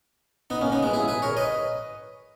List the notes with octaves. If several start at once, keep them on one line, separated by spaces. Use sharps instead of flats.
B3 D#4
A#3 C#4
B3 D#4
G#3 B3
E4 G#4
G#4 B4
A#4 C#5
B4 D#5